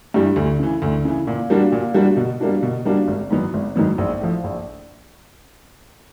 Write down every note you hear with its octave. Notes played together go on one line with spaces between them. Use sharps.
G2 E3 G3
D2
C#3 E3
D2
C#3 E3
A#2
G3 A#3 D4 F#4
A#2
G3 A#3 D4 F#4
B2
G3 A#3 D4 F#4
B2
G3 A#3 D4 F#4
G#1
G#2 D#3 F#3 B3
G#1
G#2 D#3 F#3 B3
A#1
A2 F3
A#1